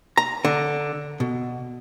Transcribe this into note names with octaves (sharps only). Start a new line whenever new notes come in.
A#5
D3
B2